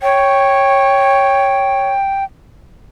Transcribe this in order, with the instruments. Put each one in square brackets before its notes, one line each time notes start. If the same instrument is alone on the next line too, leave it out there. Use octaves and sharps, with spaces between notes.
[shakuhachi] C#5 [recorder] G5